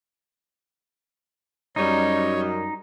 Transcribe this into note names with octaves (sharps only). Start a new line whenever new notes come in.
F#2 G3 D#4 C#5